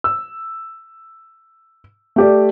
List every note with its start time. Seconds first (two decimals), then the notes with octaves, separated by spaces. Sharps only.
0.04 E6
2.16 A3 G4 D5